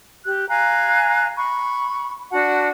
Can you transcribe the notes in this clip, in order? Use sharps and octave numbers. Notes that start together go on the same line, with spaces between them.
G4 F#6
F5 G#5 A#5 F#6
B5 C#6
D4 F#4 F#5 A5